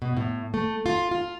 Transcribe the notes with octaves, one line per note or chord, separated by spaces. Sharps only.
B2
A2
A3
F4
F4